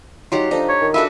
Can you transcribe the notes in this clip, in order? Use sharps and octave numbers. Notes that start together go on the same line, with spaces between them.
F#3 D#4 F4 G4 F#5 C6
F3 D4 D#4 A4 D5
C#5
D#3
D4 F4 F#4 A4 B4 E5